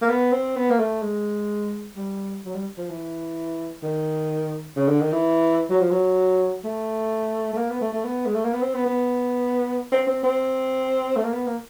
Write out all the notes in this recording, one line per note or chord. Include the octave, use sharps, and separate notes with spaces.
A#3
B3
C4
B3
A#3
A3
G#3
G3
F#3
G3
F3
E3
D#3
C#3
D3
D#3
E3
F#3
F3
F#3
A3
A3
A#3
B3
A3
A3
B3
G#3
A3
A#3
B3
C4
B3
B3
C4
C4
C4
A3
A#3
B3
A#3